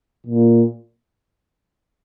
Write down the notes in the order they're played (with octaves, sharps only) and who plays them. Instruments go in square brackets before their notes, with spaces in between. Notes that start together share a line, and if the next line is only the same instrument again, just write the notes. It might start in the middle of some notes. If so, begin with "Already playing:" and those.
[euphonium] A#2